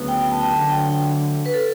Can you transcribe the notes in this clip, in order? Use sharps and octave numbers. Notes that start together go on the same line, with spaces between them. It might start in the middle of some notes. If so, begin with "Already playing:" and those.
Already playing: D2 C#3 F#3 B3
G5
G5
A5
A5
D3 F#3 A3 A5
G5
B4
A4